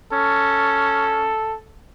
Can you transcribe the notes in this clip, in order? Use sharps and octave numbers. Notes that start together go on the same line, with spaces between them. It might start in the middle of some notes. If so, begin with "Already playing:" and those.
C#4 A4